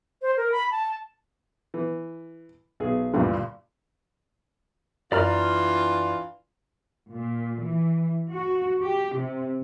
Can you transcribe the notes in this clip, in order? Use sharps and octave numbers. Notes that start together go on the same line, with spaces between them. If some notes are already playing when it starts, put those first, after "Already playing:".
C5
A#4
B5
A5
E3
B1 G#4
D2 G2 A#2 D3 E3
F#2 E3 D4 F4 D5 A#5 F6
A#2
E3
F#4
G4
C3